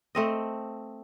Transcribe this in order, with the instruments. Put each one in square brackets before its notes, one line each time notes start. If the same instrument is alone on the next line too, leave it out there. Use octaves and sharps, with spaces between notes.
[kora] A3 C4 D#5